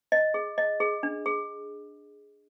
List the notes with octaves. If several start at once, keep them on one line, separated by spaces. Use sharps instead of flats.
D#5
G#4
D#5
G#4
D4
G#4